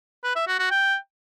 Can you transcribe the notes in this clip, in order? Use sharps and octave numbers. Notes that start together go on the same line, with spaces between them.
B4
E5
F#4
F#4
G5